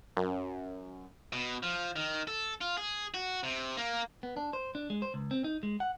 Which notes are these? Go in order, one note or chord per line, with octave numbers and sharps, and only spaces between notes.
F#2
B2
F3
D#3
A4
F4
G#4
F#4
C3
A#3
B3
D4
C5
D4
G#3
C5
C#2
C4
D#4
G#3
F#5